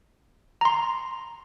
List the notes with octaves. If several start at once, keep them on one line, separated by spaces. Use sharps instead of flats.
A#5 C6